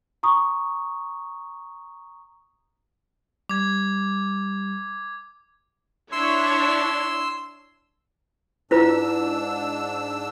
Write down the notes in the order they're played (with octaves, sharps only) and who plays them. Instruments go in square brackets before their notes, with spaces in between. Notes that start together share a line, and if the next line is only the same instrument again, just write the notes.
[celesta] A#5 C#6 D#6
[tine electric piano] G3 [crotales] D6 G#6
[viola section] D4 E4 C#5 [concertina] C6 E6
[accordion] G#2 D4 E6 [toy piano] E4 F4 B4